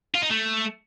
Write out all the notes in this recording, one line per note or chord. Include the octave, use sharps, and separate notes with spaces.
F4
D#4
A3